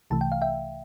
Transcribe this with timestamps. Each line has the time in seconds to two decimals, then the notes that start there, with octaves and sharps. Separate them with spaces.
0.10 C2 C3 E3 A3 A5
0.21 G5
0.32 F5
0.42 E5 G5